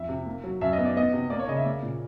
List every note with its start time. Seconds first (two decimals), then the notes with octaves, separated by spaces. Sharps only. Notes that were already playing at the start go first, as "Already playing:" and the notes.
Already playing: F2 E5
0.09 C3
0.26 A#3
0.44 F#3
0.61 F#2 E5
0.73 D#5
0.78 B3
0.85 D5
0.97 B3 D#5
1.13 C3
1.30 A#3 D5
1.39 C#5
1.48 C#3 D#5
1.57 E5
1.65 A#3 D5
1.83 A#2